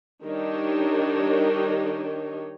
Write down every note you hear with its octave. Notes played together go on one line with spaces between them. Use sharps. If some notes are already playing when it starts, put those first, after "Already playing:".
D#3 G3 D4 D#4 G4 C#5